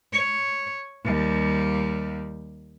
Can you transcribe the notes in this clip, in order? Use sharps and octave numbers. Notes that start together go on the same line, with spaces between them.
C#5
D#2 G3